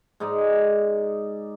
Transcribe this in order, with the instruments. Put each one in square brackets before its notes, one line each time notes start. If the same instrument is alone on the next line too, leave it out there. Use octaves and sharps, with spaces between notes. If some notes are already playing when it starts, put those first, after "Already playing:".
[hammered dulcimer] G#2 D#4 D5 D#5